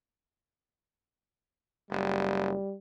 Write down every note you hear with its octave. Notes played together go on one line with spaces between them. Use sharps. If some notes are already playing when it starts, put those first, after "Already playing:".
F#1 G3